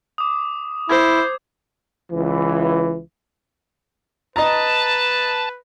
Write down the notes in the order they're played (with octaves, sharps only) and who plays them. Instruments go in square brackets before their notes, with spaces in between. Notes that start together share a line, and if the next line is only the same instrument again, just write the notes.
[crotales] D6 D#6
[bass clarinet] E4 [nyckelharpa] C5 [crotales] G#6
[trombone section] C#2 E3
[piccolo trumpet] B4 [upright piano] D#5 A#5 [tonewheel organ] A5